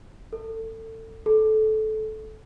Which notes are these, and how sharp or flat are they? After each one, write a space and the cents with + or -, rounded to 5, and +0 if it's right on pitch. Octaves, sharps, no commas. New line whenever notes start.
A4 +25
A4 -20